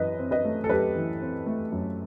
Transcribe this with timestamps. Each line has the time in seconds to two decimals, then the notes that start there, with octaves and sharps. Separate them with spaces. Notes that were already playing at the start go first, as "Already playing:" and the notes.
Already playing: F#2 E3 B4 D#5
0.19 C4
0.31 B4 D#5
0.45 A3
0.64 A4
0.69 F#2 G4 B4
0.96 E3
1.21 C4
1.46 A3
1.72 F#2